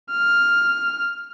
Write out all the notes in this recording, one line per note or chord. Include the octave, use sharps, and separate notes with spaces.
F6